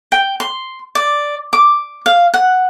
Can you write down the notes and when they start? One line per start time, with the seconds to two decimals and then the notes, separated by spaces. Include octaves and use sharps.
0.12 G5
0.40 C6
0.95 D5
1.53 D6
2.06 F5
2.34 F#5